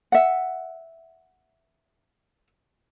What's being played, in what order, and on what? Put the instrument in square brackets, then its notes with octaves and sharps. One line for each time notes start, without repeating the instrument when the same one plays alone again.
[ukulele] E5 F#5